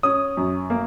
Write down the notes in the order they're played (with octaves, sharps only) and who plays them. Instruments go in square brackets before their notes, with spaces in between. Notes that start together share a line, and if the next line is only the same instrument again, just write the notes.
[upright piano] C#4 D#6
F#2
A#3